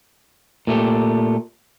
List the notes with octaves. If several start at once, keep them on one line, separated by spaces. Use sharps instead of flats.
A#2 A3 G4